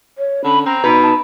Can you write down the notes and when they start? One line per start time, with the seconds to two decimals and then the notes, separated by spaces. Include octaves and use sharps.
0.18 C#5
0.44 D3 C#4 B5
0.66 C4 A#5
0.84 B2 D#4 B4
1.03 A5